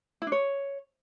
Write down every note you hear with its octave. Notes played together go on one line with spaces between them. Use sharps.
E4
D4
C#5